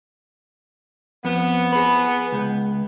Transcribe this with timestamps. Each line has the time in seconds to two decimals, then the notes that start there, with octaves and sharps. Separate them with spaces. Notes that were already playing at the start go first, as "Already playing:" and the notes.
1.25 F2 B3
1.72 G#4 B4
2.32 C#2